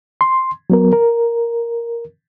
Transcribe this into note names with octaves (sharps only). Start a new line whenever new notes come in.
C6
F#3 B3 A#4
A#4